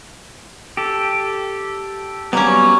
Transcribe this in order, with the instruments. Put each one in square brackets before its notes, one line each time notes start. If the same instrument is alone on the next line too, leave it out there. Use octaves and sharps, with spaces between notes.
[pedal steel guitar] G4 A4
[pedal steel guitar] F#3 G3 B3 [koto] A#3 C#4